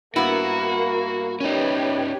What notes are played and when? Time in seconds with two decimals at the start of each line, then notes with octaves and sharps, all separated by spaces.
0.16 G2 A#3 B3 E4 F#4 A#4
1.41 C#4 D#4 G4 B4 C#5